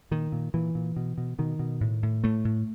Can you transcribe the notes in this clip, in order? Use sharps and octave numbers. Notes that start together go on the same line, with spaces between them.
A#2 D#3
A#2
A#2 E3
A#2
B2
B2
B2 D#3
B2
A2
A2
A2 A3
A2